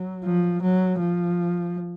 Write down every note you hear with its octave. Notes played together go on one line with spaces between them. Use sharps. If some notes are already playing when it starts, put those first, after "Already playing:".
Already playing: F#3
F3
F#3
F3